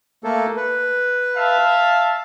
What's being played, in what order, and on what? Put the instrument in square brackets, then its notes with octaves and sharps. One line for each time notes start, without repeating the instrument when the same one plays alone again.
[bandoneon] A3 A#3 A4
B4
[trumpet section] E5 F5 A5